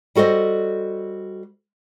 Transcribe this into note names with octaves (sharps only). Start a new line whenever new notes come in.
G3 F#4 A4 C5 D#5